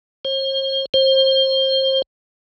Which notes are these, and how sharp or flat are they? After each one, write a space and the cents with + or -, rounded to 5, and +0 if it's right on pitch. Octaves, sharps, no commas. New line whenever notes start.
C5 +45
C5 +30